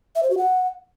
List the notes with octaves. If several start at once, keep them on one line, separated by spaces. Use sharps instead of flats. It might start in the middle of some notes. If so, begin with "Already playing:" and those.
E5
C5
F#4
F#5